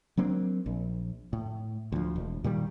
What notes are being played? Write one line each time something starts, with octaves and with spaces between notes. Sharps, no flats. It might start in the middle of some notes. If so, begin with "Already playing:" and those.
F#3 A#3 C4 D4
A#1
A2
D2 F3
E1
A#2 D#3 G3